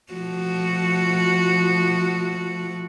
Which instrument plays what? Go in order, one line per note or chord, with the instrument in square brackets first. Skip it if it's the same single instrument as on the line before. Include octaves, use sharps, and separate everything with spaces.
[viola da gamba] F3 A3 F#4